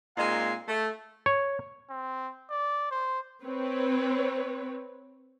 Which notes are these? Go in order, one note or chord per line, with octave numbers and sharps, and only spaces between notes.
A#2 G#3 C4 D#4 F5 G#5
A3
C#5
C4
D5
C5
C4 B4 C#5